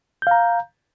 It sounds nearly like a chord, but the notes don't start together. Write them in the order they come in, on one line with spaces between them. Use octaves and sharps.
G6 F5 A#5